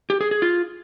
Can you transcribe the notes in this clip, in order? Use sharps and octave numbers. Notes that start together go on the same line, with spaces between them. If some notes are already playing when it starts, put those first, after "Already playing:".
G4
G#4
G#4
F4